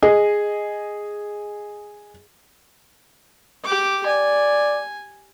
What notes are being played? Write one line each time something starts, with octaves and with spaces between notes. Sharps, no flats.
G#4 D#5
G4 D6
D5 G#5